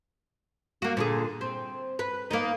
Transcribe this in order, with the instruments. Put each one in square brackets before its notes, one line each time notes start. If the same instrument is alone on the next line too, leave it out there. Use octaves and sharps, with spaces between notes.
[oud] A#3 F#4
A#2 D3 G#4
C4
B4
A#3 B3 D#4